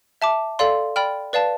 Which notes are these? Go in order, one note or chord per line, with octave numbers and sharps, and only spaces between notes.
E5 A5 D6
A4 D5 F5 C6
D5 G5 B5 F6
B4 D5 F5 A5